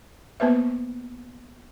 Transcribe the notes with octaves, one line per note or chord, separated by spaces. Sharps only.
A#3 B3 B4 C5 E5